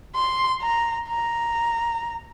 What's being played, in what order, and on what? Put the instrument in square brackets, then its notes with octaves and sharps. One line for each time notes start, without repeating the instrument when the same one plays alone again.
[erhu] C6
A#5
A#5